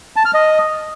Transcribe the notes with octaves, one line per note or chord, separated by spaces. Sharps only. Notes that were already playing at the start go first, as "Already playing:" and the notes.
A5
F6
D#5